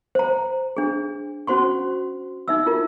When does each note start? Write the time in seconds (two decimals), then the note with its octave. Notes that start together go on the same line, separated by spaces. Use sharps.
0.15 C5 A#5
0.77 D4 G#4
1.47 C#4 F#4 C5 C6 C#6
2.48 D#4 E5 E6
2.66 E4 F4 A#4